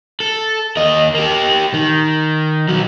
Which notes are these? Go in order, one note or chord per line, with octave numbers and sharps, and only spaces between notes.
A4
D#2 D#5
A#3 G4
D#3
B1 F#3